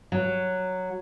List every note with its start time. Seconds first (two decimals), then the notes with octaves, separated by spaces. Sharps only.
0.12 F#3